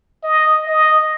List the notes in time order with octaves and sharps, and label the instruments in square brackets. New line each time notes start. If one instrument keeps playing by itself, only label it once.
[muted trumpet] D#5
D#5